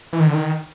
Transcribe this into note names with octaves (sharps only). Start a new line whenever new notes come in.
E3
D#3
D3
D#3